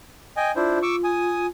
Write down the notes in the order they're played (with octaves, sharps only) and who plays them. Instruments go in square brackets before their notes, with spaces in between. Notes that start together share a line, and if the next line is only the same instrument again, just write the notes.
[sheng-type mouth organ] D#5 G5 G#5
[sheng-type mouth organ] D4 E4 C5 [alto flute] F4
[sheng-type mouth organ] C#6 D6 E6
G#5 D#6